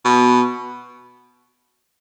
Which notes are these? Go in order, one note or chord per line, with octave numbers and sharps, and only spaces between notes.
B2